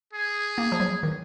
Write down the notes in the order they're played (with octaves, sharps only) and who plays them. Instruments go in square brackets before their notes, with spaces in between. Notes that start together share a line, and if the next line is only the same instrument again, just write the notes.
[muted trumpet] G#4
[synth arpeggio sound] A#3
F3
F#3
D#3